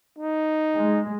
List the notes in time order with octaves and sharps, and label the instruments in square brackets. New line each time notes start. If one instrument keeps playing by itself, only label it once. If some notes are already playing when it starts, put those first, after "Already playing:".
[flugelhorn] D#4
[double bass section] G#3